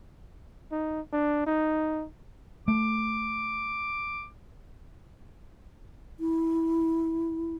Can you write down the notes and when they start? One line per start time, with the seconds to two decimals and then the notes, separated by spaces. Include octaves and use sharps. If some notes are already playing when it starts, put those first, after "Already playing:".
0.72 D#4
1.13 D4
1.46 D#4
2.68 A3 D6
6.20 E4